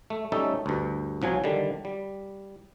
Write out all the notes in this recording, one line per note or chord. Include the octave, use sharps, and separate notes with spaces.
A3
G3 A3 C#4 D#4 A4
D2 G2
C2 F3 F#3 G#5
D3 D#3 G3
G3